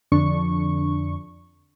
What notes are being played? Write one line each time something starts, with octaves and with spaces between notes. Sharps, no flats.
F2 D3 D4 C#6